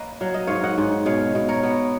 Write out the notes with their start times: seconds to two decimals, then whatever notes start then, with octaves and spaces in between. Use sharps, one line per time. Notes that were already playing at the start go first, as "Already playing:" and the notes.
Already playing: A#3 B4 C#5 D#5
0.21 F#3 F5
0.34 D#5
0.47 G#2 C#5 F5
0.63 D#5 F#5
0.78 G#2
1.06 B2 C#5 F5
1.35 B2
1.49 A#4 C#5
1.63 B3